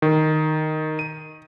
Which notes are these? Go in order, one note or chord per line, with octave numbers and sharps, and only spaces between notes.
D#3
D#7